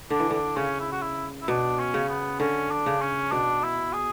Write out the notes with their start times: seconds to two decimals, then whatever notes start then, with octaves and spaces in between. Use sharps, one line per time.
0.10 D3 D4
0.20 E3
0.30 D3 D4
0.57 C#3 C#4
0.80 E4
0.92 F#4
1.02 E4
1.42 E4
1.48 B2 D4
1.79 C#4
1.94 C#3
2.09 B3
2.40 D3 C#4
2.71 D4
2.86 C#3
3.01 C#4
3.32 B2 D4
3.63 E4
3.93 G#4